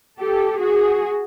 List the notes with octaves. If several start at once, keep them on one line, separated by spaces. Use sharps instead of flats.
G4 A4
F#4 G#4